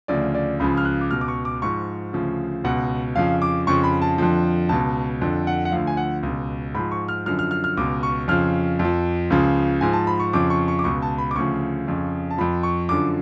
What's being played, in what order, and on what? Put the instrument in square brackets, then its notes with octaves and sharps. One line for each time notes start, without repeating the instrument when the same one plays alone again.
[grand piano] D2 C#3 F3 D5
D5
C#2 C#3 F3 B5
F6
F#6
D6
C#2 B2 F6
D6
C#6
D6
G#2 F3 C#6
D2 C#3 F3
C#2 B2 F#5
F2 C#3 F3 F5
D6
F2 C#3 F3 C#6
B5
A5
F2 D3 F3
C#2 B2 A5
F2 D3 F3
F#5
F#5
D2 D3 F3 F5
G#5
F#5
C#2 B2
G#2 F3 B5
C#6
F6
F#2 D3 F3 F6
F6
F6
F6
C#2 B2 D6
C#6
F2 C#3 F3 F6
F2
F3
C#2 C#3 F3
G#2 F3 G#5
A5
B5
C#6
F2 C#3 F3 D6
C#6
C#6
D6
C#2 B2 C#6
A5
B5
D6
D2 C#3 F3 C#6
F2 C#3 F3
A5
F2 F3 B5
C#6
F#2 D3 F3 D6